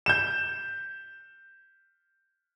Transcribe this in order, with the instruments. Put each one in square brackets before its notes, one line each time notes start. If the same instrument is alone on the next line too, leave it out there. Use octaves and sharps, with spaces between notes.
[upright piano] G6 E7